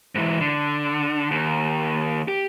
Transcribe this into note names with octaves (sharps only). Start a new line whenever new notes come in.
G#2 E3
D3
D#2
G4